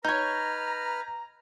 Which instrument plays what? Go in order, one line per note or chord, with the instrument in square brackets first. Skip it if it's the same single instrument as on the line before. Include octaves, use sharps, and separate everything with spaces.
[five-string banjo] D#4 C#5 [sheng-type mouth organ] B4 F6 [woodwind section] A#5 [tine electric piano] G6 G#6